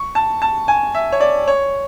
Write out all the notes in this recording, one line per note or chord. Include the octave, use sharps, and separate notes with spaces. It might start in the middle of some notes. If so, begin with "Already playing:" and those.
Already playing: C#6
A5
A5
G#5
E5
C#5
D5
C#5